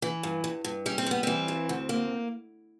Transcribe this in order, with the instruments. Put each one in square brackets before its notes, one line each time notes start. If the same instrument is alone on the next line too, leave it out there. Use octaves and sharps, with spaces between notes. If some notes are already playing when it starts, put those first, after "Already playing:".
[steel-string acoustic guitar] E3
G2
G2
G2
G3 C#4
C4
G3 B3
E3 C4
G2
D2
A#3